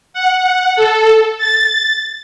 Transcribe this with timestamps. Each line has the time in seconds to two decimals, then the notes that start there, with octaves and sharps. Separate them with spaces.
0.13 F#5
0.76 A4
1.38 A6